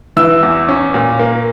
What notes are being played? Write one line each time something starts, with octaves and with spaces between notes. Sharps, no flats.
E3 E6
E2
C#4
A#2
A#3